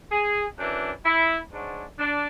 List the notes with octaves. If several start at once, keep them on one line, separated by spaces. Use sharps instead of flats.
G#4
F#2 E3 D4
E4
G#2 F#3 D4
D4